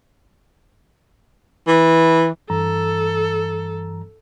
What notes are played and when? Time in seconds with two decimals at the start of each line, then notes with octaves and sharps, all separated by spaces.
1.67 E3
2.50 G2 E3 A4 A#5